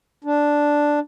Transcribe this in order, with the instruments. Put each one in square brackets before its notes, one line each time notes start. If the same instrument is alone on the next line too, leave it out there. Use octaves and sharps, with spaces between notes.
[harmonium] D4